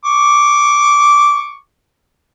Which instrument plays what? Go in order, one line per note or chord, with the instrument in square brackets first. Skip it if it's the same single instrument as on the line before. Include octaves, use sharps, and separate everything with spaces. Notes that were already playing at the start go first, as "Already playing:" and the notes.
[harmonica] C#6 D6